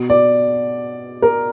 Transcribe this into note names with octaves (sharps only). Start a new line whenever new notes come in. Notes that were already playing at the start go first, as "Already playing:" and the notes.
Already playing: B2
D5
A#4